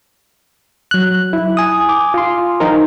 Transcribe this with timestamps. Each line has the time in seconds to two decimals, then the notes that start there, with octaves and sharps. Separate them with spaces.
0.91 F#3 F#6
1.33 E4
1.57 G#5 D#6
1.89 D6
2.14 F4 C6
2.60 F3 D#4 A#4